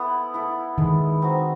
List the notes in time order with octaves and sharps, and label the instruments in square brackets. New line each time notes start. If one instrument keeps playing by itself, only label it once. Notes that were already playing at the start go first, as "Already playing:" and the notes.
Already playing: [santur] B3 E4 A4
E4 A4
[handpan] D#3 [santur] G#3
[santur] C4 D#4 F#4